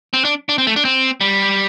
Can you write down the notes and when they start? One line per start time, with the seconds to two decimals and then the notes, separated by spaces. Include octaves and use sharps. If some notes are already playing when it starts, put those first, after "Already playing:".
0.13 C4
0.25 D4
0.49 D4
0.58 C4
0.67 A3
0.76 D4
0.85 C4
1.21 G3